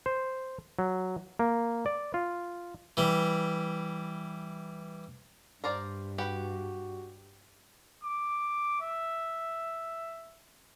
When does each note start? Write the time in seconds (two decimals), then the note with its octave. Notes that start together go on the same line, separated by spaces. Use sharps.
0.06 C5
0.79 F#3
1.39 A#3
1.86 D5
2.14 F4
2.97 E3 G3
5.64 G2 A#4 C5 D5
6.18 F#4 G4 B4 F#5
8.04 D6
8.82 E5